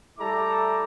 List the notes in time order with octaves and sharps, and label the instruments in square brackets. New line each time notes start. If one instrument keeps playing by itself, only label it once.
[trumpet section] G3 A3 E4 A4 A#5 D6